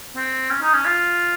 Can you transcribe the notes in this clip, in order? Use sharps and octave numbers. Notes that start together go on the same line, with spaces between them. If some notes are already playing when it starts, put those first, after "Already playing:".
C4
C#4
D#4
C#4
F4